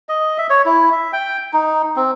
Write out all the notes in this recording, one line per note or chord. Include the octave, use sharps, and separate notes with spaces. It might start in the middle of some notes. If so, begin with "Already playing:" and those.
D#5
E5
C#5
E4
E5
G5
D#4
C4